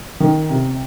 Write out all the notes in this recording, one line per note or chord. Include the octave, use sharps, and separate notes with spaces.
D#3
C3